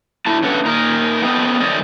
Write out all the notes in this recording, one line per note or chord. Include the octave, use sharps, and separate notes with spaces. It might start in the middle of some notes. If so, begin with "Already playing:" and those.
D3 A3 E4 A5
C#3 A3 D4 A4 B4 F#5
A#2 D#4 A#4
B3 C4 A4 C5 D#5
D#3 G3 A4 C5 D5 D#5